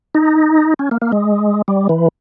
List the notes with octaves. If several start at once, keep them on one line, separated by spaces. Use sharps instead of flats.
D#4
C#4
A#3
A#3
G#3
G3
E3